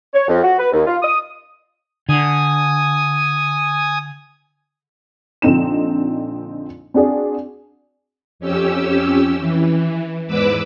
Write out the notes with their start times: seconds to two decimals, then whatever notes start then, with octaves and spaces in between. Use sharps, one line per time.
0.14 C#5
0.28 F2
0.43 F#4
0.58 B4
0.73 D#2
0.87 F4
1.02 D#6
2.09 D3 G#5 D#6
5.42 A#1 D3 C4 D#4 E7
6.94 C4 D4 F#4 G#4 D5
8.39 F2 C#4 G4 E6
9.38 E3
10.27 E2 G#2 B4 D6 E6